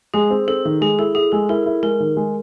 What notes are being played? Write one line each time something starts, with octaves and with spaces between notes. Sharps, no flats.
G#3 G#4
C4
C4 A4
D#3
G#3 G#4
E4 A4
E4 G#4
G#3 A4
E4 A#4
E4
G#3 A#4
D#3
G#3